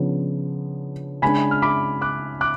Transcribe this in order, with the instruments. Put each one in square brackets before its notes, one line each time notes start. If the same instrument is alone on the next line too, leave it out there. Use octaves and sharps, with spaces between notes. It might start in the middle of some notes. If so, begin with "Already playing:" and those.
Already playing: [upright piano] C#3 F3 B3 D4
[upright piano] C#3 G#3 D4 [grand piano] G#5 B5
[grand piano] F6
B5 D6
D6 F#6
D6 F#6